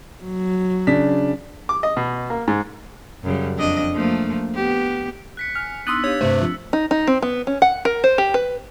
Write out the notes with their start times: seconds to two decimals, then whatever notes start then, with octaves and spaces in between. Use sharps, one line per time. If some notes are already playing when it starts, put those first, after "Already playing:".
0.24 F#3
0.87 C#3 D4 B6
1.69 D6
1.83 D#5
1.97 B2
2.30 A#3
2.48 G#2
3.24 F#2 C#3 G3
3.56 F2 D4 D#5
3.94 F3 A3 A#3
4.55 B3 G4
5.37 F#6 B6 C#7
5.55 G#5 F6
5.87 B3 D4 D#4 C6 D#6 E6 F#6 A6
6.04 D4 G4 C#5 F5
6.21 G2 C3 A3 C4 D4 C5
6.42 F3
6.73 D#4
6.91 D#4
7.07 C4
7.22 B3
7.47 C#4
7.62 F#5
7.85 A#4
8.04 C5
8.18 G4
8.34 B4